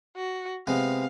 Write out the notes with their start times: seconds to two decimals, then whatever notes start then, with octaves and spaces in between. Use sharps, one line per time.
0.16 F#4
0.67 C3 G#3 B3 F5